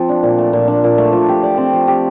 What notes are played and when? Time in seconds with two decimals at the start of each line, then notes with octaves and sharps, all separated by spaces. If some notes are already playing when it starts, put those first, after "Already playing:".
Already playing: F3 C4 F4
0.09 D4
0.23 A#2
0.38 A3
0.53 A#2
0.68 D4
0.84 A#2
0.98 A3
1.13 F3
1.29 G4
1.43 D5
1.58 C4
1.73 F3
1.87 G4